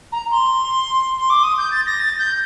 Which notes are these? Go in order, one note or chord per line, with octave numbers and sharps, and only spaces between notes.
A#5
C6
C6
D6
D#6
G6
A6
A#6
A6
G6